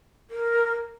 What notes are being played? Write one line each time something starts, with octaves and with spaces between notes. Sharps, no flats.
A#4